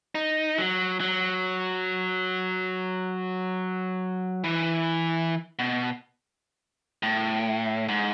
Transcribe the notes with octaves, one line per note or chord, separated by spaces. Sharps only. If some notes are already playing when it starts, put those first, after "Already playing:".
D#4
F#3
F#3
E3
B2
A2
G#2